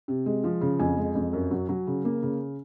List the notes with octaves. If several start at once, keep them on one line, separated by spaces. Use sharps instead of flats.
C3
G#3
F3
C#3
F2 G#5
G#3
F2
F#2
F#3
F#3
C#3
A#3
C#3